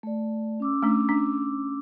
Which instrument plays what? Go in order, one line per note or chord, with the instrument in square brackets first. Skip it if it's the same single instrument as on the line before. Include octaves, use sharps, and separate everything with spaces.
[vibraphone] A3 D5
C#4 D6 E6
[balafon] A3 D4
D4